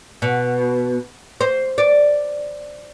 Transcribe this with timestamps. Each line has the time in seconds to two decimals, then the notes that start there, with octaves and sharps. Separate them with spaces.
0.22 B2
1.41 C5
1.78 D5